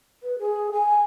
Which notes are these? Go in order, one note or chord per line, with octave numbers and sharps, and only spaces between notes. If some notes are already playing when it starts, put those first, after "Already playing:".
B4
G#4
G#5